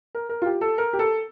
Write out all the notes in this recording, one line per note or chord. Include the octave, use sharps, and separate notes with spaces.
A#4
A#4
F4
G4
A4
A#4
G4
A4